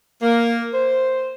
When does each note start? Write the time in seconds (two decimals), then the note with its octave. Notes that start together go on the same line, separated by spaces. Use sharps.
0.22 A#3
0.74 C5